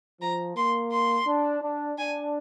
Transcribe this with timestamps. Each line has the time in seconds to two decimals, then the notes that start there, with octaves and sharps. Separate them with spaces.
0.22 F3 A#5
0.56 A#3 C6
0.91 C6
1.27 D4
1.62 D4
1.98 D4 G#5